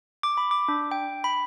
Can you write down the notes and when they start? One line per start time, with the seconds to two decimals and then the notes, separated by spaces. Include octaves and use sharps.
0.23 D6
0.37 B5
0.51 D6
0.68 D4
0.91 G5
1.24 B5